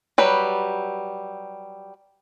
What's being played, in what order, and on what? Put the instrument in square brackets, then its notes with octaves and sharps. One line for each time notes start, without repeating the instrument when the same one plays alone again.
[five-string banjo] F#3 G3 B4